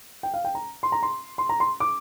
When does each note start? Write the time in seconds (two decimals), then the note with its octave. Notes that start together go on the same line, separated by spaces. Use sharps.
0.23 G5
0.34 F5
0.45 G5
0.55 A#5
0.83 C6
0.92 A#5
1.03 C6
1.38 C6
1.49 A#5
1.60 C6
1.80 D6